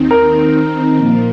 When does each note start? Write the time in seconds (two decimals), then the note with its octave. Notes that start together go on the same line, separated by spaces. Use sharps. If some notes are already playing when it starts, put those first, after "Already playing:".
Already playing: D#2 D#3 C4 D#4
0.11 A#4
0.40 D#3 C4 D#4
0.97 A#2 F3 A#3